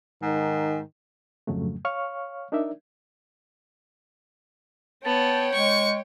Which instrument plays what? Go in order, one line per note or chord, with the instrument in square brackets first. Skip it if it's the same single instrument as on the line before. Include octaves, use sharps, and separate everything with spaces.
[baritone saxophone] G#2 [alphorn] D#3
[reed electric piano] F2 G#2 C#3 F#3 A3
C#5 F5 C#6 F6
D4 D#4 A#4 D5 E5
[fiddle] B3 [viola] C#5 G5 [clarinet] A5
[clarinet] G#3 [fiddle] C#6